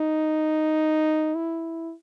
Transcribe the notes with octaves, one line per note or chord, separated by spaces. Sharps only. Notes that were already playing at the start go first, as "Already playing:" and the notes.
Already playing: D#4
E4